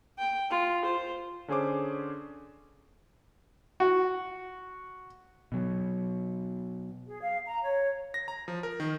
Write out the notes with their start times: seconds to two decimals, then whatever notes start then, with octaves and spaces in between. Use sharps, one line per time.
0.18 G5
0.51 F4
0.85 C5
1.48 D3 C#4 G#4 C5 D6
3.80 F#4
5.52 B2 F#3
7.06 G#4
7.21 F5
7.46 A#5
7.63 C#5
8.14 A#6
8.28 A#5
8.48 F3
8.63 A#4
8.80 D#3